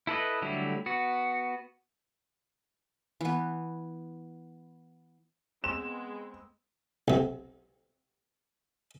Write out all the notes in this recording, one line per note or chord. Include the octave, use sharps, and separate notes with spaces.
E4 A4 B4 D#5
D3 F#3 G3 A3 E4
B3 F#4
E3 B3
G#3 B3 C4 E7
B1 C3